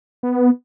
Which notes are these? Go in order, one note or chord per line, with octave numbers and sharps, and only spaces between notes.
B3